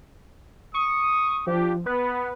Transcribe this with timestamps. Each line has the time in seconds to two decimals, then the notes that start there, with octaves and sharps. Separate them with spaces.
0.74 C#6 D#6
1.47 F3 D4 G4
1.86 B3 B4